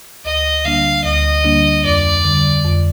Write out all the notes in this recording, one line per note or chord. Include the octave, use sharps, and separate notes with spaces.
D2 D#5
D3 G3 A#3 D4 F5
D2 D#5
D3 G3 A#3 D4
F2 D5
D3 G3
F2